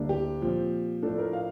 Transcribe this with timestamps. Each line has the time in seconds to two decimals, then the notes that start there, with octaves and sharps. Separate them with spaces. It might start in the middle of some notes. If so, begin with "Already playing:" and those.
Already playing: D2 D3 G3 A#3 D4
0.09 G4
0.41 A#2 F3 C4
1.02 A2 F3 A3 D4 A4
1.18 A#4
1.33 F5